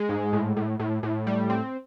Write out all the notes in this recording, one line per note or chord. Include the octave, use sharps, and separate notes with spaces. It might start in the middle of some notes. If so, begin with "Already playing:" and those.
Already playing: G#3
G#2
A2
A2
A2
A2
G3
C4